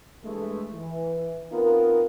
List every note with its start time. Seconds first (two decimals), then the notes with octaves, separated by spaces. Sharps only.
0.24 G2 E3 G#3 A3
0.73 E3
1.51 B3 C4 D#4 F4 A#4